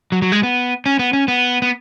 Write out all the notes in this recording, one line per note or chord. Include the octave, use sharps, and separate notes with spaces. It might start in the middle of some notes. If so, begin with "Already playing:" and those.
F#3
F#3
G#3
B3
C#4
B3
C#4
B3
B3